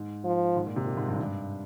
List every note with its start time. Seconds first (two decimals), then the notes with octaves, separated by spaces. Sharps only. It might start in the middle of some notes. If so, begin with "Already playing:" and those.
Already playing: G#2
0.25 F3
0.56 G#2
0.67 A#2
0.76 C3
0.86 A#2
0.97 G#2
1.08 G2
1.16 G#2
1.23 G2